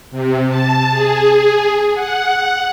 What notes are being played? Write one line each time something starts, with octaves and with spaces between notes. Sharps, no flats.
C3
A5
G#4
F#5